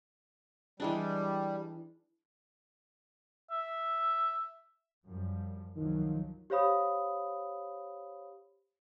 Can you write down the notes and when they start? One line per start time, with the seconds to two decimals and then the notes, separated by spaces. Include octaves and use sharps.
0.80 E3 G3 G#3 D4
3.51 E5
5.06 F#2 F3 G3
5.76 C2 D#3 F3 F#3
6.50 G4 C5 C#5 F5 B5 D#6